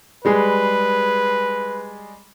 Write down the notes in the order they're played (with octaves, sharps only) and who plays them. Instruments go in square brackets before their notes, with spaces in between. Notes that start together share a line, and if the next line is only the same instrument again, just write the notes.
[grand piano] G3 G#3 G#4 [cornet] B4